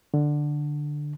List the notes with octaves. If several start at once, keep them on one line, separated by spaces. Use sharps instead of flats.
D3